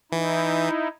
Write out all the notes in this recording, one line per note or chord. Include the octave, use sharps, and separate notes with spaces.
E3 D#4 E4